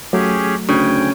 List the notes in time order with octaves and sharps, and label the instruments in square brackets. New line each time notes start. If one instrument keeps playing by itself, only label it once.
[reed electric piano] F#3 A3 [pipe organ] C#4 G4 G#4
[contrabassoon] D2 [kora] C#3 [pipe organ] G5 G#5